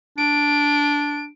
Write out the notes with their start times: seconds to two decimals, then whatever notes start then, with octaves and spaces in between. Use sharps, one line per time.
0.18 D4 D7